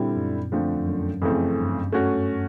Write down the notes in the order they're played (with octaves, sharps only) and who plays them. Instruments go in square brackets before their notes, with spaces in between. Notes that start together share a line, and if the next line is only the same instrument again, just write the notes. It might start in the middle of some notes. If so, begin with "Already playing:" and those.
Already playing: [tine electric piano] A#2 [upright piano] D3 G3 C4 E4
[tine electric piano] F#2
[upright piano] D3 F3 A3 C4
[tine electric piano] F2
F#2
[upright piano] F2 C#3 E3 A3 C4
[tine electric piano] G2
[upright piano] A3 C#4 F#4